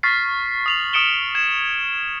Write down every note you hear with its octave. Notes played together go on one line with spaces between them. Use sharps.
C#6 F6 A6 B6 C7
D#6 F7 F#7
D#6 F6 C#7 D7 E7 G7
G#6 E7